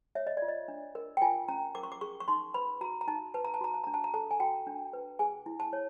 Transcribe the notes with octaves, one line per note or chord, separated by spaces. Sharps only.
C#5 E5
D#5
D5
F4
D#5
D4
A#4
G5
F4 G#5
C#4 A#5
A#4 D6
C#6
D6
G#4 C#6
C#6
D#4 C6
B4 B5
F#4 A#5
A#5
D#4 A5
B4 A5
A#5
A5
F#4 A#5
A5
D4 A#5
A5
A#5
A4 A5
G#5
F#4 G5
D4
B4
G#4 G#5
E4
A5
C#5